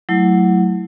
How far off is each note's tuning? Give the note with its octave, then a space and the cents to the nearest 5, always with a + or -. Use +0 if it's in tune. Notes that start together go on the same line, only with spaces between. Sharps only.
F#3 +0 A3 +0 E4 +0